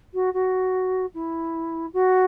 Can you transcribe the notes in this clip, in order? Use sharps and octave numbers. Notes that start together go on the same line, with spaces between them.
F#4
F#4
E4
F#4